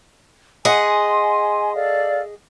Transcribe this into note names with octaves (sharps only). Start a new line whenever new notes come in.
G#4 D#5 F#5 G#5 C6
A4 D5 F5